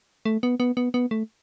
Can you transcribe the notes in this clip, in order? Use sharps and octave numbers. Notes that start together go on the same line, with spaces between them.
A3
B3
B3
B3
B3
A3